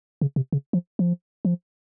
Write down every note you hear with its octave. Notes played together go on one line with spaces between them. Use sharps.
C#3
C3
C#3
F3
F3
F3